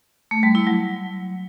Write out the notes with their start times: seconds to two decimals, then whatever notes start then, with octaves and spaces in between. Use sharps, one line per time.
0.31 A3
0.43 G3
0.55 E4
0.67 F#3